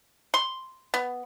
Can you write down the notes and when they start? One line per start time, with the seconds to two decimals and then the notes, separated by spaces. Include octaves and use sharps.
0.34 C6
0.94 B3